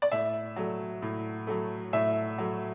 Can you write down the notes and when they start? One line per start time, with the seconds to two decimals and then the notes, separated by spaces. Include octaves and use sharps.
0.02 D5
0.12 A2 E5
0.56 F#3 A3
1.02 A2
1.47 F#3 A3
1.93 A2 E5
2.38 F#3 A3